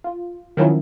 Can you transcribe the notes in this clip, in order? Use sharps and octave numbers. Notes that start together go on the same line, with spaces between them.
F4
D#3 F3 F#3 C#4 E4